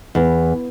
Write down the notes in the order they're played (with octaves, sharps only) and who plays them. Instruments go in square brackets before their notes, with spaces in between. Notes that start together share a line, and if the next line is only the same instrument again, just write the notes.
[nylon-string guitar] E2